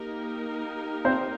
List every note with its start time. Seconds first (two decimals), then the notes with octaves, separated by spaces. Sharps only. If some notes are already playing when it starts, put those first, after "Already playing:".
Already playing: A#3 D#4 G4 A#4
1.05 C4 C5